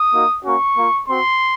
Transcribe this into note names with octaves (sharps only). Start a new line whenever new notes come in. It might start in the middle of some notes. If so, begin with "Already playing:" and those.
Already playing: D#6
A#3 D#4 F#4
A#3 C#4 F#4 C#6
A#3 F4
C4 F#4 C6